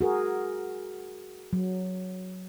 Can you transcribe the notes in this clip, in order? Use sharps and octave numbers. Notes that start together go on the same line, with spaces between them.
F#4 G#4 A#4
F#3